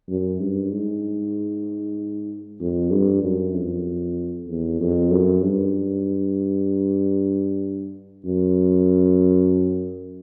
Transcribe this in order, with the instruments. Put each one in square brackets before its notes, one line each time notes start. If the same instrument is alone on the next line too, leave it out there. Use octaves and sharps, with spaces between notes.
[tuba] F#2
G2
G#2
F2
G2
F#2
F2
E2
F2
F#2
G2
F#2